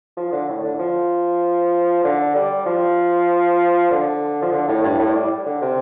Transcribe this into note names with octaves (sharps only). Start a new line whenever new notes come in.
F3
D3
A2
D3
F3
D3
G3
F3
D3
F3
D3
A2
G2
A2
G3
D3
C3